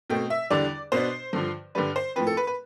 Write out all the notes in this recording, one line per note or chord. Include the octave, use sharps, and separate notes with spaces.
B2 A3 C4 G5
E5
E2 D3 G3 D4 D5
B2 B3 D4 C5
G2 D3 F3
G2 D3 G3 D4 B4
C5
A2 F3 C4 B4
A4
B4
B4